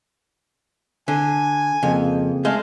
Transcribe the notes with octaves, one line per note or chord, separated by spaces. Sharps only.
D3 G#5
F2 C#3 A#3 C4
G#3 A3 F5